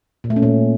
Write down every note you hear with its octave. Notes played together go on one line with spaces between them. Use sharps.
A#2
A3
C#4
A#2